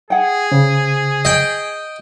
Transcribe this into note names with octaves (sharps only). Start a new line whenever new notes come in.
G#4 F#5 G5
C#3 C5
D#5 G5